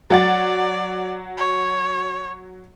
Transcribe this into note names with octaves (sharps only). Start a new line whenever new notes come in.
F#3 D5 F#5 A6
C#5